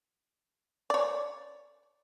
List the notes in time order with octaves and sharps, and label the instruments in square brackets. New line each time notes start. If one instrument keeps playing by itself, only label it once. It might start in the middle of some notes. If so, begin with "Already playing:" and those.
[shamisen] C#5 D5